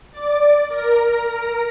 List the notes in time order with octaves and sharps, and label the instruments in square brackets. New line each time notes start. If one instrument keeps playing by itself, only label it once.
[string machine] D5
A#4